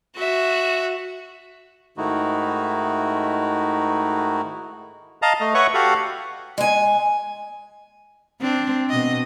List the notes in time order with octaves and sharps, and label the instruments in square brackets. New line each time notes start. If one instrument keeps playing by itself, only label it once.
[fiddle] F#4 E5
[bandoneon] G#2 D#3 A3 D#4 E4 F#4
[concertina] D#5 F5 A5 A#5
A3 D#5
B4 C#5 E5 F#5 C#6
F#4 G4 A4 F5 F#5
[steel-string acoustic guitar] G#3 G#5
[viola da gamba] C4 D4
B2 D#5